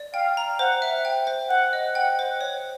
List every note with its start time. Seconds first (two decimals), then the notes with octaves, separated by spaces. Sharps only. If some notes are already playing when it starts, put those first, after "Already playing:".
Already playing: D5
0.14 F5 G5
0.37 A#5
0.59 C5 F#5
0.82 E5
1.05 G5
1.27 C5
1.50 C5 F#5
1.73 D#5
1.95 F#5 G5
2.19 C5
2.41 C#5